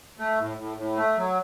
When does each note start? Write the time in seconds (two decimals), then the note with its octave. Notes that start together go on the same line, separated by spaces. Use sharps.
0.18 A3
0.39 A2
0.57 A2
0.78 A2
0.96 A3
1.17 F#3